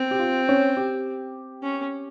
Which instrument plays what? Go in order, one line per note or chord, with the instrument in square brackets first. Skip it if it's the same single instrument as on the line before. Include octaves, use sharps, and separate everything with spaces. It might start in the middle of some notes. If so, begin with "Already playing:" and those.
Already playing: [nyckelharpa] C4
[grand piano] G4
F4
C#4
G4
[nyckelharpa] C#4